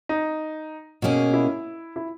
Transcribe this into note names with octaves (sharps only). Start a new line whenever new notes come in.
D#4
B2 A#3 C#4 G#4
E4
E4